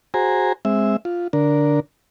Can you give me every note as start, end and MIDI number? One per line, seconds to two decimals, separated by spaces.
0.14 0.53 66
0.14 0.53 68
0.14 0.53 72
0.14 0.53 80
0.14 0.53 82
0.65 0.97 56
0.65 0.97 60
0.65 0.97 76
1.05 1.28 65
1.33 1.80 50
1.33 1.80 62
1.33 1.80 70